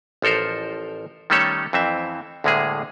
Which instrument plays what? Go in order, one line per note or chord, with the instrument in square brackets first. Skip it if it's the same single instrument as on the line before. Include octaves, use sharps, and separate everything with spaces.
[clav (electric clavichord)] A1 F3 A4 A#4 C5
D#3 G3 A3 C#4 A4 C#5
F2 E3 C4 E5
D2 A2 D3 G#3 A#3 G#4